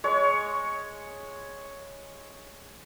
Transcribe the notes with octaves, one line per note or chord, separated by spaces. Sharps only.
G#3 C#5